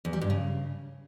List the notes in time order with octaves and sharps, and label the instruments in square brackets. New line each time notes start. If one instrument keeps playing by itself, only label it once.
[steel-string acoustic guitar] E2
G3
G2
C#3